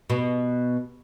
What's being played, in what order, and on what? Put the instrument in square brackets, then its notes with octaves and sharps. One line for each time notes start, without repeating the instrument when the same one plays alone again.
[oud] B2